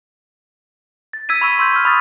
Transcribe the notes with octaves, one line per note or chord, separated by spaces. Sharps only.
A6
E6 G#6 B6 D#7
B5 C#6 E6 D#7
C6 E6 G6
C#6 E6 F6
B5 D#6 A6